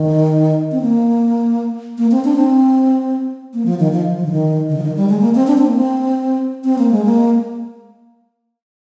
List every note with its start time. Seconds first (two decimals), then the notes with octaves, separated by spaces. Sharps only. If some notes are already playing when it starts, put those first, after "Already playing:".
Already playing: D#3
0.72 C4
0.82 A#3
1.98 A#3
2.11 C4
2.24 D4
2.36 C4
3.54 A#3
3.66 F3
3.79 D#3
3.92 F3
4.17 F3
4.26 D3
4.32 D#3
4.69 D3
4.78 F3
4.83 D#3
4.96 G3
5.09 G#3
5.21 A#3
5.35 C4
5.47 D4
5.58 C4
5.67 A#3
5.76 C4
6.64 C4
6.78 A#3
6.91 G#3
7.05 A#3